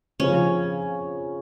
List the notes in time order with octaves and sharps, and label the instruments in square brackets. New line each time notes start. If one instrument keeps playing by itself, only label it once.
[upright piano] C#3 F3 C4 [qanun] C#4